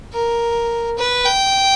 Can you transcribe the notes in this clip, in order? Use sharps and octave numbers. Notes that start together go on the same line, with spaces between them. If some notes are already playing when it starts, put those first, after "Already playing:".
A#4
B4
G5